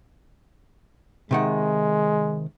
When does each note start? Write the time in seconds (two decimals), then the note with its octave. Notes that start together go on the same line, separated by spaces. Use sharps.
1.31 C3 D#3 G#3 F#5